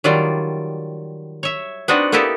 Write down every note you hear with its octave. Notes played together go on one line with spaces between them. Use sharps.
D#3 F#3 G3 F4 D5
C#5 E5
B3 C4 D4 D#4 F#4 D#5
A#3 B3 D#4 E4 G4 A4